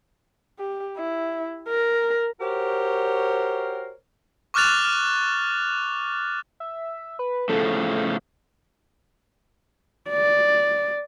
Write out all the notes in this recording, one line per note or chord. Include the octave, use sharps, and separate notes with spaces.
G4
E4
A#4
F#4 G4 A#4 C5 C#5
C#6 D6 F6 F#6 A6 F7
F6
E5
B4
A2 C#3 F3 A4
D5